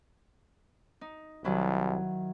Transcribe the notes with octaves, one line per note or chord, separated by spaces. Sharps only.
D#4
C2 D#3 F#3 E4